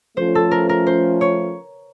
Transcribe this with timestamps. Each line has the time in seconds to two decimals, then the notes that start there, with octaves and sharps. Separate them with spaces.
0.17 F3 A3 C#4 C5
0.35 A4
0.51 A#4
0.69 A#4
0.87 C5
1.21 C#5